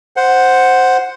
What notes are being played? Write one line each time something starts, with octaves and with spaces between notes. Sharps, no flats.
C5 F#5